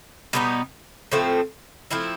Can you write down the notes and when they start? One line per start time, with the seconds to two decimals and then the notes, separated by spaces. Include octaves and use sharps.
0.33 B2 G3 B3 D#4
1.12 A2 F3 A3 C4
1.91 F3 A3 C4 E4